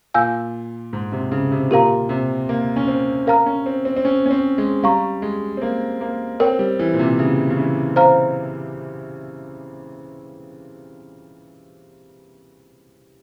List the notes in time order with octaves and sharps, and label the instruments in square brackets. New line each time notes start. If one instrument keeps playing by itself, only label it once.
[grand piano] A#2 [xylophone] F5 G#5 E6 G6
[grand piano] G#2
C3
C#3
C3
[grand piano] A#2 [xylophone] G4 A#4 F5 A#5
[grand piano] C3
A#3
C#4
C4
[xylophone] A#4 F5 A#5 F6
[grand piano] C#4
C4
C4
C4
C#4
C#4
C4
G#3
[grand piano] G3 [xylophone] F5 A#5 C#6
[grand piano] G#3
C4
A#3
A#3
[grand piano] C4 [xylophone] A#4 C#5 G5
[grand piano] G3
E3
A#2
C3
C#3
C#3
E3
[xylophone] C5 F5 A#5 F6